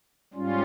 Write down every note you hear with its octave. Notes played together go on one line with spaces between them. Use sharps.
G#2 G3 C#4 F4